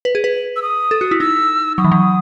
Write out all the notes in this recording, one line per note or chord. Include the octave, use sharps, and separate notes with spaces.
B4
G#4
B4
E6
D#6
A4
F#4
E4
D#4 E6
F#3 D#6
E3
F#3